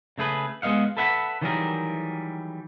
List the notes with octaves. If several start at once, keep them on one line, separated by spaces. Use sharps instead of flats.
C#3 A3 G#4 B4
G#3 B3 D#5 F5 F#5
A4 B4 E5 F#5 G5 B5
D#3 E3 F#3 G3 G#4 A#4